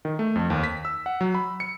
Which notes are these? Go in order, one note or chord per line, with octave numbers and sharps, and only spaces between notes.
D#3
A3
F2
D#2
B6
E6
F#5
F#3
B5
C#7